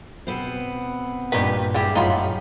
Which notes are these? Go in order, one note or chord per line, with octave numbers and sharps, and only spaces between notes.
B2 B3 C4
G2 A#2 D#3 G4 B4
G3 E4 G4 G#4
F#2 A2 D#4 F4 G#4 B5